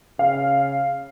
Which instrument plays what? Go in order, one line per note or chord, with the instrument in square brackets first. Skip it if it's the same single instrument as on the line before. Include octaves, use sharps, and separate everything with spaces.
[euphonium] C#3 [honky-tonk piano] F5